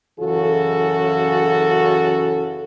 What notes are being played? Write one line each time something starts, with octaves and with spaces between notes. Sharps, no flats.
F#2 C#3 E3 C#4 F#4 A4